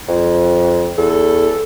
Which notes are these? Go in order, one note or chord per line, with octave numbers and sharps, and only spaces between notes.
F2
E2 A4